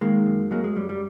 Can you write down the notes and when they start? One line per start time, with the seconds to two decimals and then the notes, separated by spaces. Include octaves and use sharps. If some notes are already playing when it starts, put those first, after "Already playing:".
0.01 D#3 G#3 A#3
0.26 F#2
0.51 F#3 G#3 A#3
0.64 G#3
0.76 F#2 G3
0.89 G3